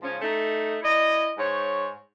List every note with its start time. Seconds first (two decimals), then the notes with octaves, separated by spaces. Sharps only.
0.02 G#2 C#3 F3 C#4
0.22 A3 D#4
0.82 E4 D5 D#5
1.38 G#2 C5 C#5